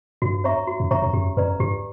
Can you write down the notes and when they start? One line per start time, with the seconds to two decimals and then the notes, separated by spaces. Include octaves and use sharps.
0.22 G2 F#4
0.44 C#5 E5 A#5 C#6
0.67 F#4
0.80 F#2
0.91 G2 C#5 E5 A#5 C#6
1.02 F#2
1.13 F#2 G4
1.37 F#2 B4 D5 A#5
1.60 G2 G4